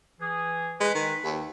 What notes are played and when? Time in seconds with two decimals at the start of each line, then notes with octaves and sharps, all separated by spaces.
0.20 E3 G#4
0.80 G#3 B4
0.95 D#3
1.24 D#2